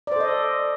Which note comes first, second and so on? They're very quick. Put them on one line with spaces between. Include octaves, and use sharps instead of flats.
D5 C5 A4 D#5